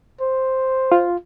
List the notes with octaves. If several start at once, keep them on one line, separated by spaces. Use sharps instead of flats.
C5
F4